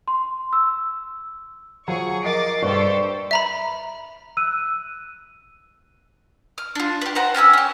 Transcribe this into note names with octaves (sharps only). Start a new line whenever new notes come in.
C6
E6
F3 F#3 G#4 C#6
A#4 D#5 D6 A6 C7 D7
G2 G4 A4 C5 C#6
E5 A#5 B5
E6 F#6 D#7
F6
D4 F4
G4 B4
B4 C5 F#5 A#5
C#4 G4 G#5 E6
C#4 G4